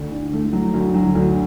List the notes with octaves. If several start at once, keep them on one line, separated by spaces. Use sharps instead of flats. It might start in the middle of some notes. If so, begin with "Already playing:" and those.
Already playing: D2
D3
A3
F#3
D2
F#3
D2